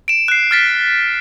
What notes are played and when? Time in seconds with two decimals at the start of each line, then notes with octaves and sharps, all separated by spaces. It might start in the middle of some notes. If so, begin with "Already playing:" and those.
0.08 D7 E7
0.28 F#6 C7
0.51 F6 A6 B6